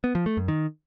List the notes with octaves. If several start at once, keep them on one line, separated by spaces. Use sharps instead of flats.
B3
F3
A3
F#2
D#3